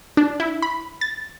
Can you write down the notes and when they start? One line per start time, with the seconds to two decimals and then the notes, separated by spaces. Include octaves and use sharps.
0.17 D4
0.40 E4
0.62 B5
1.01 A6